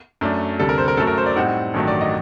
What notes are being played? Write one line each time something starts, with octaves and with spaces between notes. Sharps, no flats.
F#2 F#3 A3 D4
D2 C3 G3 A4
A#4
C5
A#4
F#2 F#3 A3 A4
A#4
C5
D5
A2 G3 C4 D#4 F#5
A1 G2 D#3 F#3 A3
D5
D#5